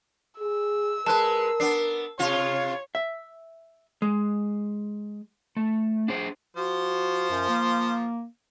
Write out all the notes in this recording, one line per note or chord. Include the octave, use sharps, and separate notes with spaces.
G#4 E6
G#3 A#4 B4 A5 F#6
B3 D4 C7
C3 F4 C#5
E5
G#3
A3
D4 G#4 C5
F3 F#4 C5
F#2
A#3